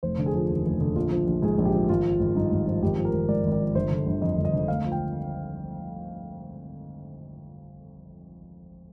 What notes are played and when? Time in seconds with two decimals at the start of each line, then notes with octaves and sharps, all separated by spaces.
0.03 F1 C5
0.18 D3
0.26 G#4
0.35 F3
0.50 D#2
0.66 F1
0.81 D3
0.96 A#1 F4
1.11 F3
1.27 A#1
1.42 G#2 G#4
1.58 A#1
1.65 G4
1.74 F3
1.89 G#1 F4
2.05 F3
2.20 G#1
2.35 G2 D#4
2.51 G#1
2.67 F3
2.83 G#1 G4
2.98 F3
3.05 A#4
3.13 G#1
3.28 G#2 D5
3.44 G#1
3.52 D5
3.59 F3
3.75 G1 C5
3.91 D3
4.06 G1
4.22 F2 D#5
4.37 G1
4.45 D#5
4.53 D3
4.68 D2 F5
4.84 F3
4.92 G5